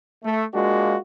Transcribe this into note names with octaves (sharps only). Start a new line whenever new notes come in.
A3
G#3 A#3 D4 F4 F#4